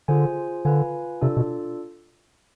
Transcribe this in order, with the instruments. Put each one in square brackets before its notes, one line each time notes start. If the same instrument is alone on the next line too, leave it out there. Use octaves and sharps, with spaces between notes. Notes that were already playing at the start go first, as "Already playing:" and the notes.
[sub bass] D3 [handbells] F4 G#4 C5 G#5
[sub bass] D3 [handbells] F4 B4 F5 G#5
[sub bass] C3 [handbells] D4 F4 A4 D5
[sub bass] B2